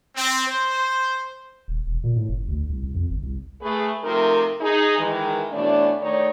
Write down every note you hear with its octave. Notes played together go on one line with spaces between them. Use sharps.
C4
C5
D#1
E1
A#2
A2
F#1
D2
C2
C2
F2
G1
C2
A3 G#4 B4
C3 F3 A3 D#4 A#4
D#4 G#4
D#3 E3 G#3
B2 E3 A3 C#4 D4
D#3 A3 D#4 C#5 D5